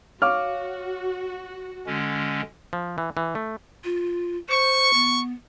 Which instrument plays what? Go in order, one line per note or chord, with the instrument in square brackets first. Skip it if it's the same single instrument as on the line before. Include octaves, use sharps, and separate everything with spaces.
[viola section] F#4 [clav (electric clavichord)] C#5 F5 [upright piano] D6 F6
[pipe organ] D3 G#3 C#4
[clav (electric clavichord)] F3
E3
E3
A3
[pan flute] F4
[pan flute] C5 [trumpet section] C#6
[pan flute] B3